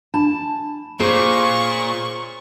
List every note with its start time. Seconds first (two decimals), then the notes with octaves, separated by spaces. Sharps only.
0.14 D4 A5 B5
1.00 A#2 G#4 C5 C#5 C#6